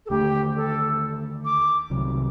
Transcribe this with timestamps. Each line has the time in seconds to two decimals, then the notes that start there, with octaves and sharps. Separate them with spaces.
0.06 A4
0.10 D#2 D3 A3 D4 G4
0.56 A4
1.45 D6
1.90 C2 C3 D#3 F#3